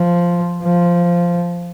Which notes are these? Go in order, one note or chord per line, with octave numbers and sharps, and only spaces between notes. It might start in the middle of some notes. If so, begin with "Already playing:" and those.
Already playing: F3
F3